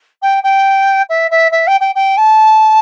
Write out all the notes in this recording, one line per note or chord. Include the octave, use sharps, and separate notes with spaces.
G5
G5
E5
E5
E5
G5
G5
G5
A5